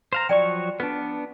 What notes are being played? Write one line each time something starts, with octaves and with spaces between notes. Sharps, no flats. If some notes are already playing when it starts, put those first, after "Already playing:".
C5 F5 A#5
F3 F#3 D5 G5 C#6
B3 D4 B4